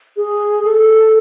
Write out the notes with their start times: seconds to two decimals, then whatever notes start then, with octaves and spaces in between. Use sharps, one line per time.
0.17 G#4
0.65 A4